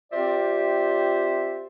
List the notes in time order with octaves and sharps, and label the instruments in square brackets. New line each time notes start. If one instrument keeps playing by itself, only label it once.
[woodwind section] C4 F4 G4 C5 D5 E5